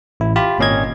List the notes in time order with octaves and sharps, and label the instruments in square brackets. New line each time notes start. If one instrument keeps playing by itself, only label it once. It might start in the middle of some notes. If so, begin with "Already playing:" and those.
[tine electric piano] A1 E4
F4 G4 B5
G#1 A#2 C#4 D#5 G#6